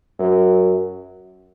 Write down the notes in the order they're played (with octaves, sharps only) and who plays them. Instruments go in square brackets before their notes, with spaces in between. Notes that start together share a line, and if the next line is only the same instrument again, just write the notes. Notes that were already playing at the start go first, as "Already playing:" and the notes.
[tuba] F#2